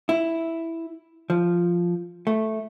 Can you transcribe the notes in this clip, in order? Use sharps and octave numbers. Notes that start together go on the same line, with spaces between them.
E4
F3
A3